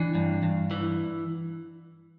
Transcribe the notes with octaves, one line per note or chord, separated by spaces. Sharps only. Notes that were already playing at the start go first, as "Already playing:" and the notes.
Already playing: E3 D4
G2
G2
E3